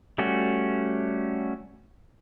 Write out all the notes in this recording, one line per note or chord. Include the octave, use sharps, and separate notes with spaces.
G3 A3 C#4 F#4